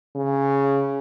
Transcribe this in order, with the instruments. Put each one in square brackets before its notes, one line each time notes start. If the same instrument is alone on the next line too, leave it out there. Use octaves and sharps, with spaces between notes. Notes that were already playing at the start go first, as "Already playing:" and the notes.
[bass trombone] C#3